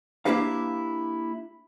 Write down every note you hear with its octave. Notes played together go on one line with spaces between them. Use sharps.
A#3 D4 E4 G4 B4 F5